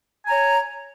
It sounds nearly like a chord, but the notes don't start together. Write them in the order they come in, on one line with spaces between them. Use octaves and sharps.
G#5 A#5 C#5